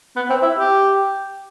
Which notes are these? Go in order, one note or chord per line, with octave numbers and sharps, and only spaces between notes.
B3
C4
E4
G4